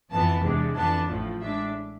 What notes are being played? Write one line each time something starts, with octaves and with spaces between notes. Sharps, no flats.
F2 E3 B3 A5
E2 C3 G#3 D4
F2 E3 B3 D4 A5
A1 A2 F3 A3
A2 G#3 D4 E5